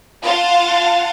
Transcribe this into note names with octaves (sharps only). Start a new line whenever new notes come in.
F4 F5 F#5 A5 A6